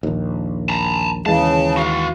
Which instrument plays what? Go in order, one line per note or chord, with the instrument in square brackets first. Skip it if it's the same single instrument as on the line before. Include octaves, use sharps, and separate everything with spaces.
[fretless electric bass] A#1 D#2
[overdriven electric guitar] A5 A#5
[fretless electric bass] D#2 E3 G#3 [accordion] C#3 [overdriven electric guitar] A5
[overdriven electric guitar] F#4 F5